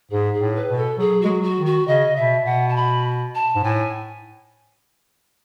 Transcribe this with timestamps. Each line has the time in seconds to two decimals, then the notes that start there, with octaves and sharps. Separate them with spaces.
0.10 G#2 G#4
0.33 G#4
0.40 A2
0.55 B4
0.69 B2
0.77 A4
0.98 F#3 G#4
1.21 G#3 F#4
1.28 F#3
1.43 F#4
1.58 D#3
1.65 F#4
1.87 C#3 D#5
2.16 B2 E5
2.45 B2 F#5
2.68 A5
2.75 B5
3.35 A5
3.55 G#2
3.63 A2 G#5